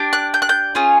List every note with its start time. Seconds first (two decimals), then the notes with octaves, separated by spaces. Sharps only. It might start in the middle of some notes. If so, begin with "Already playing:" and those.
Already playing: D4 G4
0.13 F#6
0.34 G6
0.42 F#6
0.49 G6
0.75 C#4 F4 G#4